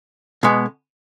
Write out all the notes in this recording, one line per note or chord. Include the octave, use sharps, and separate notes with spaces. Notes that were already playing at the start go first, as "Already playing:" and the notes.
B2 G#3 B3